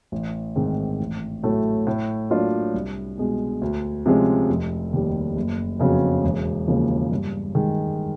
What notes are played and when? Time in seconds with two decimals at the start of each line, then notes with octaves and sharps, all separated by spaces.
0.12 A1
0.56 G#2 D#3 G#3 C4
1.00 A1
1.43 A2 F#3 A3
1.87 A2
2.30 F#3 A#3 D4 F4
2.74 C2
3.18 B2 G#3
3.62 D2
4.06 C3 F3 G#3 C#4
4.49 F1
4.93 D#2 D#3 G3
5.36 F#1
5.80 F2 C#3 F#3 B3
6.24 E1
6.68 D#2 C#3 F3 A#3
7.12 G2
7.55 D#3 G#3